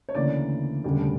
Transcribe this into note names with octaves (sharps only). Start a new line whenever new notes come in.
C#5
D2 C#3 E3 A#3 D5
E1 D2 C#3 G3